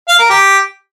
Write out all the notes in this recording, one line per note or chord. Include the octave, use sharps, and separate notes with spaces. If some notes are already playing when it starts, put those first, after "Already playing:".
F5
A#4
G4